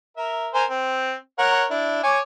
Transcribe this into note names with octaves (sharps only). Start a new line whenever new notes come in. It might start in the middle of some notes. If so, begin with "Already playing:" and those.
A#4 E5
A#4 C5 G#5
C4
A#4 C#5 F#5
D4 E4
C#5 G#5 D6